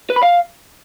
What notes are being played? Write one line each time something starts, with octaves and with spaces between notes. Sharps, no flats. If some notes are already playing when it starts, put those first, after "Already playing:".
B4
B5
F5